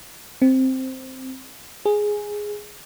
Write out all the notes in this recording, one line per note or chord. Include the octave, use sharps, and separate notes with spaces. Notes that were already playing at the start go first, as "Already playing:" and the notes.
C4
G#4